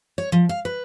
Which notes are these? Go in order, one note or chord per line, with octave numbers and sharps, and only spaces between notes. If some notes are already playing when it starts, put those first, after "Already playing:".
C#5
F3
F5
B4